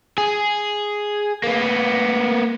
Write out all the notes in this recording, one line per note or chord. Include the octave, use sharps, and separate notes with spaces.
G#4
A#3 B3